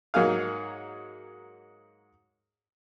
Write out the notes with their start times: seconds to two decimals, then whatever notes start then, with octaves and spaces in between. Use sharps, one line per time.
0.14 G#2 F#3 A#3 G#4 F5